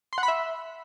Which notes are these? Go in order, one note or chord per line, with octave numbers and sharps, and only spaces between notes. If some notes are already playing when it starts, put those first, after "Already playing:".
C6
F#5
B5
E5